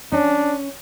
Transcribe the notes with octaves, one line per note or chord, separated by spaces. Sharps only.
C#4 D4